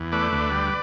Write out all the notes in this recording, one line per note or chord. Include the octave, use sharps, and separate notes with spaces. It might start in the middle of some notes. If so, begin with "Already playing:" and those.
Already playing: E2
A3 B4 D5
D2
G3